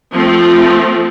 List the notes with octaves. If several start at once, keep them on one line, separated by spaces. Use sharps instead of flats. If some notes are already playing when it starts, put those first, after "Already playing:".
F3 A3 C4